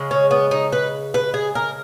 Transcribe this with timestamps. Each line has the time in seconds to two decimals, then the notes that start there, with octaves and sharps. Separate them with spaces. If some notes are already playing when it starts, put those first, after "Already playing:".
Already playing: C#3 G#3
0.11 C#4
0.31 B3
0.51 D#4
0.72 B4
1.14 B4
1.34 G#4
1.55 A#4